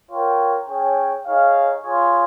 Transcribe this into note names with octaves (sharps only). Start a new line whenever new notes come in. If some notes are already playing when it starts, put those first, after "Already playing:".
F4 A#4 C#5 G5
C#4 G#4 C#5 G5
D#4 G#4 C#5 F5
F4 G#4 C#5